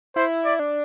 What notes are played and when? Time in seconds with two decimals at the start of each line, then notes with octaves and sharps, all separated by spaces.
0.16 E4 C5
0.45 D5
0.59 D4